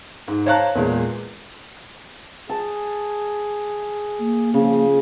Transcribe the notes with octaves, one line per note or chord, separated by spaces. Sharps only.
G#2
C5 C#5 F5 A5 A#5 F#6
E2 A#2 G#3
G#4 A5
A#3
C#3 F3